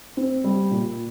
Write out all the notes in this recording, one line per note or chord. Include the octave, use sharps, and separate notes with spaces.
C4
G3
A#2